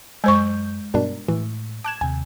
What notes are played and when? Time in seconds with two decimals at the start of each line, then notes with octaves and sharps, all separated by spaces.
0.24 F#2 G#3 C5 G#5 C#6 G6
0.94 G2 B2 D4 A#4
1.29 A2 E3
1.84 A5 D6 F#6 G#6 E7
2.01 D#2 C3 G#5